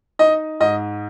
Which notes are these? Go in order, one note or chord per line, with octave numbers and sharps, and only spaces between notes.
D#4 D#5
G#2 D#5